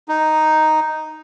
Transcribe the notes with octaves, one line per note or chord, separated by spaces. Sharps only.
D#4